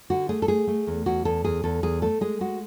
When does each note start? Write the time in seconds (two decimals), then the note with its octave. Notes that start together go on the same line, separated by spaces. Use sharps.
0.10 D3 F#4
0.29 A3 G#4
0.42 A4
0.48 A3 G#4
0.67 A3
0.87 E2
1.06 E2 F#4
1.25 E2 A4
1.44 E2 G#4
1.63 E2 A4
1.83 E2 G#4
2.02 A3 A4
2.21 G#3 G#4
2.41 G#3 F#4